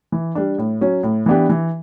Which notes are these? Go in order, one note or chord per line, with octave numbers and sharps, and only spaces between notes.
E3
G3 D4
A2
F#3 C#4
A2
E3 B3 D4 G4
E3